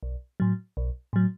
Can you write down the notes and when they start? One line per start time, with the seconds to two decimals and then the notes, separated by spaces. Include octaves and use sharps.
0.03 B1
0.40 A2 F#3
0.77 B1
1.13 A2 F#3